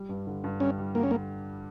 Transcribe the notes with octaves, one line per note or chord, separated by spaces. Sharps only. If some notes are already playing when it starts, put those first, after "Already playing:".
Already playing: G3
G2
D3
G2
G3 C#4
G3
D3 A#3
C#4
A#3